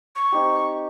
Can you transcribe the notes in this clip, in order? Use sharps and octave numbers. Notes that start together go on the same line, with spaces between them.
C#6
C4 D#4 G4